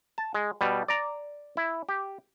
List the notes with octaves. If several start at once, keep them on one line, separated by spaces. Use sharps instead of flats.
A5
G#3
B2 G3
D5 A#5
E4
G4